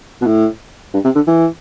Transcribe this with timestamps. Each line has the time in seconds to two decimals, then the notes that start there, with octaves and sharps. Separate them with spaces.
0.21 B2
0.27 A2
0.94 G2
1.05 C3
1.15 D3
1.27 E3